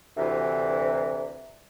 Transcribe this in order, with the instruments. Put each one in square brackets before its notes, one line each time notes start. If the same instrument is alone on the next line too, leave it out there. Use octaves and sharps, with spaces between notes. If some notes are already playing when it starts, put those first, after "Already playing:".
[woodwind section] D2 C3 E3